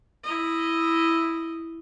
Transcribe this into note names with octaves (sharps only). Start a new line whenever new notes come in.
E4 D#5